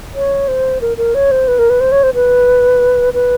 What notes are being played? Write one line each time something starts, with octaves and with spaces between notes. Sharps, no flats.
C#5
C5
A#4
A#4
C#5
C5
B4
A#4
B4
C5
C#5
C5
B4
B4